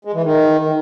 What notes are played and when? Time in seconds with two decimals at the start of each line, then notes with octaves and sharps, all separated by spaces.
0.05 G#3
0.14 E3
0.23 D#3